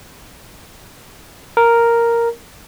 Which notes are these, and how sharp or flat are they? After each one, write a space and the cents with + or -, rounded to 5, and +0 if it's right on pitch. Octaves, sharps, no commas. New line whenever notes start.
A#4 +0